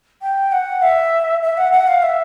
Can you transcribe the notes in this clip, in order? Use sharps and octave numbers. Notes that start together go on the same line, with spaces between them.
G5
F#5
E5
E5
F#5
F#5
F5
E5